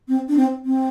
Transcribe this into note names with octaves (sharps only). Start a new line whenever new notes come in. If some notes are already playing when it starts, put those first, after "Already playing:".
C4
D4
C4
C4